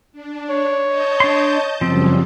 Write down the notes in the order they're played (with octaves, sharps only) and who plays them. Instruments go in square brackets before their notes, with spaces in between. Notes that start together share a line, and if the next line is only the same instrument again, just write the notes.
[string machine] D4
[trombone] C#5
[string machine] D#5 A5 G6
[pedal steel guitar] D4 C6
[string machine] F#2 C#3 G3 [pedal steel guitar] F3 C4